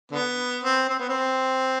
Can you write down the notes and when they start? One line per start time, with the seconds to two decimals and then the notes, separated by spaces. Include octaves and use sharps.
0.11 D3 B3
0.64 C4
0.89 C4
0.99 B3
1.09 C4